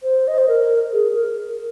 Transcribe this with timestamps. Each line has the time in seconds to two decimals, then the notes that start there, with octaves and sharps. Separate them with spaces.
0.03 C5
0.28 D#5
0.38 C5
0.48 A#4
0.93 G#4
1.15 A#4